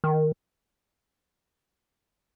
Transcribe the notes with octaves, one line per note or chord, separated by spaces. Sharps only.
D#3